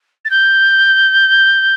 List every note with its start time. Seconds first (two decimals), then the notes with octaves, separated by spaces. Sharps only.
0.25 A6
0.30 G6